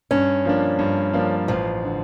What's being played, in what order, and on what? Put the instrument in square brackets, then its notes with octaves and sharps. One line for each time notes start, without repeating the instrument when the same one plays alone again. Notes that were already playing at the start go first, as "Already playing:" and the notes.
[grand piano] G2 [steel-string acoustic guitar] C#4
[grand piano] F3 A#3 D4
G2
F3 A#3 D4
[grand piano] A1 [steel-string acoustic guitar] F3
[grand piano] D3